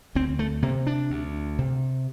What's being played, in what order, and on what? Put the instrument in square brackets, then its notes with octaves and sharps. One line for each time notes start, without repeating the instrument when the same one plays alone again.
[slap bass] D2 C4
A3
C3 A#3
D4
D2
C3